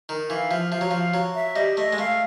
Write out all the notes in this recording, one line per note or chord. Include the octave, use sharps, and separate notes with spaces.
D#3
E3 F5
F3 E5
F3 F5
F#3
F3 F5
F#3
E5
G3 D#5
A3 D#5
G#3
A3 F5